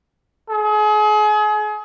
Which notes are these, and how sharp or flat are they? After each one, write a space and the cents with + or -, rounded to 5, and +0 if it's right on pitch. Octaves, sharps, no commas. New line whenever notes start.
G#4 +35